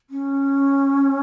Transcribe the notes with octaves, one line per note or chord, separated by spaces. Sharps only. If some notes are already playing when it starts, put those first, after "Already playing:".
C#4